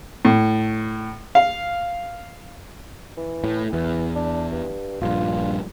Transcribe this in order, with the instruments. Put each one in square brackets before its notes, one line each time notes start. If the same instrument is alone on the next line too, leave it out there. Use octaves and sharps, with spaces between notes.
[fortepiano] A2
F5
[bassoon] E3
[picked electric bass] A2
[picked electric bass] E2 [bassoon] E3
[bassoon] D4
G2
[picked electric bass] A#1 G2 [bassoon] F4